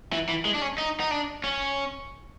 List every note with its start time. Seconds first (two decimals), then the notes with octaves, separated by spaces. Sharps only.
0.13 E3
0.29 E3
0.45 G#3
0.54 D4
0.62 C#4
0.78 D#4
1.00 D#4
1.11 D4
1.44 C#4